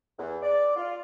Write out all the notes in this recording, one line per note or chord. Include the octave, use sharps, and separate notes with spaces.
E2
D5
F4